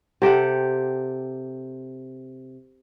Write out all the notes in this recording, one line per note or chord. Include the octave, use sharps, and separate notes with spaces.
C3 G4 A4 F#5